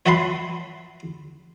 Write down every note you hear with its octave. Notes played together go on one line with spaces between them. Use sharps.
C#5 E5 F#5 A5 B5 C6